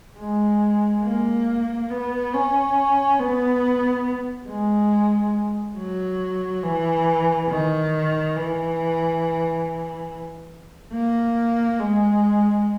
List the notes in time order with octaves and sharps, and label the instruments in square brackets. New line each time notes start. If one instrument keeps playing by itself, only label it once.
[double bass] G#3
A#3
B3
C#4
B3
G#3
F#3
E3
D#3
E3
A#3
G#3